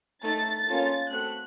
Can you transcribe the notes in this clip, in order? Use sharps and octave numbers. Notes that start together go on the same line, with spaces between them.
A3 D#4 A4 A6
A#3 C#4 F4 A4
A3 C4 F#4 A4 F#6